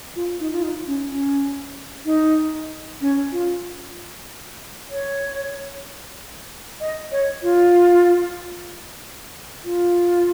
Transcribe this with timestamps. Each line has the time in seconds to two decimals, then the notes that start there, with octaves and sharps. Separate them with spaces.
0.16 F4
0.40 D#4
0.51 F4
0.63 D#4
0.87 C#4
1.11 C#4
2.05 D#4
3.01 C#4
3.32 F4
4.90 C#5
6.81 D#5
7.12 C#5
7.43 F4
9.65 F4